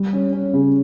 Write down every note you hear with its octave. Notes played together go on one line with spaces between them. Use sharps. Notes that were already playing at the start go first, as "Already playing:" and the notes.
Already playing: G3
C#4
C#4
C#3